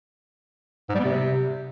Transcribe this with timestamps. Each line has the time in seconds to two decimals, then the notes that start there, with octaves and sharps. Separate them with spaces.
0.89 G#2
0.94 G3
1.00 B3
1.05 C3